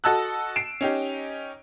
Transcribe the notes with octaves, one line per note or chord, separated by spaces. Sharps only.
F#4 A4 D#5 A5 E6 F#6
C7 D7 E7
C#4 D#4 G4